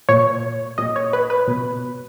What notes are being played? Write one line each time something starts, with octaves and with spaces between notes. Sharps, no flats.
A#2 C#5
A#2 D#5
C#5
B4
B4
B2